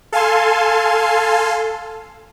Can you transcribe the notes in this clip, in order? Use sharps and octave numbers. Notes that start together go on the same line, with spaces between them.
A4 F5 G#5 A5 C6